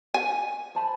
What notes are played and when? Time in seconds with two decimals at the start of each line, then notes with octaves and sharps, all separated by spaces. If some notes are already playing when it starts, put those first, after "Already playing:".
0.14 G#5
0.75 C5 A5 B5